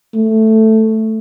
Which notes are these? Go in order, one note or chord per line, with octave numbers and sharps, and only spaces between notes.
A3